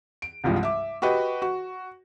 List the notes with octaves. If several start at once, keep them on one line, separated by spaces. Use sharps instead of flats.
D7
C2 G2 F3 G3 G#3
E5 D6
F#4 G4 B4 D#5
F#4